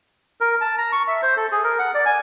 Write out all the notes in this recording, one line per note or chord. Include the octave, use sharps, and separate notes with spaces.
A#4
A5
A#5
C#6
E5
C5
A4
G#4
A#4
F#5
D5
G#5